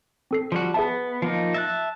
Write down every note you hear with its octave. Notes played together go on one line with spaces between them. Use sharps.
C4 A4 C7
F3 G3 F#4
B3 G#4 E5 A5
F3 A#3 D#4
E5 A5 F#6 A#6